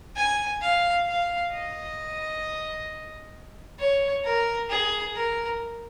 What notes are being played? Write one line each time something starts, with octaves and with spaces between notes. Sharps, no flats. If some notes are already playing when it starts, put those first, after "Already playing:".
G#5
F5
F5
D#5
C#5
A#4
G#4
A#4